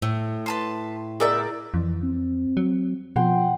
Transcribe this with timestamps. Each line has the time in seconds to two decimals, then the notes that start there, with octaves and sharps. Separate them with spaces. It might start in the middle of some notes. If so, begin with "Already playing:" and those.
0.02 A2 A3
0.46 B4 A5 C6
1.20 B3 G#4 A#4 D5 E5 G6
1.74 F2 E3
2.03 C4
2.57 F#3
3.16 B2 F3 F#5 G5 C6